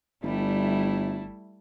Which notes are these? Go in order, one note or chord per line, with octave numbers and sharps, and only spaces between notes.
G1 G3 A3 E4